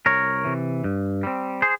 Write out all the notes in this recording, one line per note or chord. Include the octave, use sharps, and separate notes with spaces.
C2 A#4 C#5
C3 E3
G2
G3 C4
G#4 C5